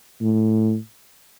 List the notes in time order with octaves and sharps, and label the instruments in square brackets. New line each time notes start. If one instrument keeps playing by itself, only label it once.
[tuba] A2